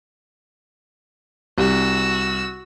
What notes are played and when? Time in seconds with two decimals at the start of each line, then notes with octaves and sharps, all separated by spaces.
1.58 C2 F#4 E6